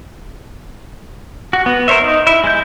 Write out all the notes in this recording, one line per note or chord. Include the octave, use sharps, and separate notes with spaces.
F#4
B3
A#4 C5 C#5 E5
D#4
E4 E5
G#3 G6